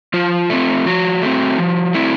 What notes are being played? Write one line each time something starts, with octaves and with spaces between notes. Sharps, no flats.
F3 F4
A3 C4
F3 F#4
A3 C4
F3
A3 C4 E4